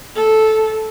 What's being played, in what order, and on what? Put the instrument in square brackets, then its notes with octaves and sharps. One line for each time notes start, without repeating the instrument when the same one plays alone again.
[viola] A4